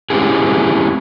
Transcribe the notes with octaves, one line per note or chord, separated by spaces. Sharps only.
G#3 C4 C#4 E4 G4 G#4